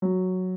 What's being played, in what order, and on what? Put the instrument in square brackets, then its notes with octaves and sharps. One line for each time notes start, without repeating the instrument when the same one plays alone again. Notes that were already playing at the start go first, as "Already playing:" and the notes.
[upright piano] F#3